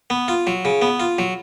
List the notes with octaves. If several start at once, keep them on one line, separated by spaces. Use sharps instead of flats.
B3
F4
F#3
C#3
B3
F4
F#3